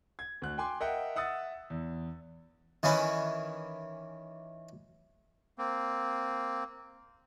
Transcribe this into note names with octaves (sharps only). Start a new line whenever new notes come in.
G#6
D2 F#6
G5 G#5 C6 D6
A#4 D#5 E5 F#5 G5
E5 F#5 D#6 E6 A6
E2
D#3 E3 C#4 E4
A#3 C4